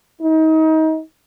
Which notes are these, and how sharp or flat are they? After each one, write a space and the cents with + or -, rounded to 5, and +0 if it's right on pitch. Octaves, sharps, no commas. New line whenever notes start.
D#4 +30